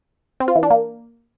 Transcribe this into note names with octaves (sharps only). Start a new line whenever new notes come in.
C4
F4
E3
D4
A#3